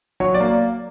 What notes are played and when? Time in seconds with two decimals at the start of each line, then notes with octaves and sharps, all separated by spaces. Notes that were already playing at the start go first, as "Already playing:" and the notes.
0.20 F#3 C#5
0.34 D5
0.40 A#3